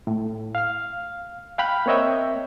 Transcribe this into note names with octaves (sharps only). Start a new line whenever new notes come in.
A2
F5 F6
F5 G5 B5 F6 F#6
A#3 C4 C#5 D#5 E5 G5